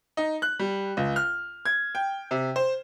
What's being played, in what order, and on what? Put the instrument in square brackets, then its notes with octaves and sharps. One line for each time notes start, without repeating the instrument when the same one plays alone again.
[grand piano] D#4
F#6
G3
C#2
F6
G#6
G5
C3
C5